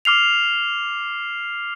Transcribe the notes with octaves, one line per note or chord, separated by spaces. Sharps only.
D6 F6 C7 F7